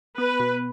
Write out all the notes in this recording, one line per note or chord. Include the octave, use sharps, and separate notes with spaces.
B3 B4
B2